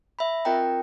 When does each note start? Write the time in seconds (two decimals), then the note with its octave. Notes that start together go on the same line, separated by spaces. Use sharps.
0.19 E5 B5
0.45 C4 F4 A#4 D#5 G5 A#5